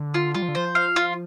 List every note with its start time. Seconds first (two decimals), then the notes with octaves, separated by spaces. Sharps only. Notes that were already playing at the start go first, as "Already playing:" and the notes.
Already playing: D3
0.14 F4
0.35 G3 F4
0.42 F3
0.48 D3
0.55 F3 C5
0.75 F5
0.96 F4